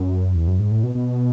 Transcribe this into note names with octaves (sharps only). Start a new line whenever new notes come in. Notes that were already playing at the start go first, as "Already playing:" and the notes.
Already playing: F#2
E2
F#2
G#2
A2
B2
B2